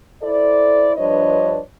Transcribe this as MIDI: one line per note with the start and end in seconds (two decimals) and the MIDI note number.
0.22 0.92 64
0.22 0.92 69
0.22 0.92 72
0.22 0.92 74
0.97 1.59 43
0.97 1.59 53
0.97 1.59 62
0.97 1.59 71
0.97 1.59 73
0.97 1.59 75